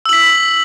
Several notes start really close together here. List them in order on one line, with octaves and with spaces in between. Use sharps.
E6 F#7 B6